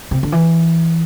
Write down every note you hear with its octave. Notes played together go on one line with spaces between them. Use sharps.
C3
D3
E3